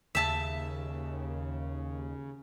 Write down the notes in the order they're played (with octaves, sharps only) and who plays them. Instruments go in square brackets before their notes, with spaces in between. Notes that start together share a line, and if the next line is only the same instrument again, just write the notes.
[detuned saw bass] D#2 [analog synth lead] C#3 [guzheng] E5 A5